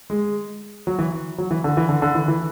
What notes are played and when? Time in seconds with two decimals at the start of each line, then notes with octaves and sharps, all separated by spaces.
0.10 G#3
0.87 F#3
0.99 E3
1.38 F#3
1.51 E3
1.64 D3
1.77 E3
1.89 D3
2.02 D3
2.15 E3
2.28 E3